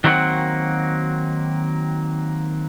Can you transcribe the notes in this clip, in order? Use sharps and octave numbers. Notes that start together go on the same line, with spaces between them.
D#3 F#3 A#3 C4 F#4 F#5